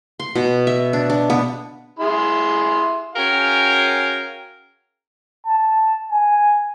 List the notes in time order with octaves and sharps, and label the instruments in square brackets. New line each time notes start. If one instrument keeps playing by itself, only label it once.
[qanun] C6
B2
E5
D4
D4
B3
[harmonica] E4 G#4 C6
[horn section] C#4 F#4 G#4 A#4 F5 G5
[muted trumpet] A5
G#5